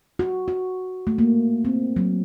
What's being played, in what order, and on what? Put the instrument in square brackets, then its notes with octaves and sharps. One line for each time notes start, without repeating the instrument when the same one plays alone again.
[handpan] F#4
F#4
A3
A#3
C4
F#3